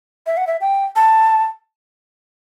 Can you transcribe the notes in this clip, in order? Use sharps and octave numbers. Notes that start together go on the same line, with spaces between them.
E5
F#5
E5
G5
A5